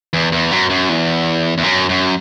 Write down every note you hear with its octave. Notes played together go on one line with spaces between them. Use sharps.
E2
E2
F#2
F#2
E2
E2
F#2
F#2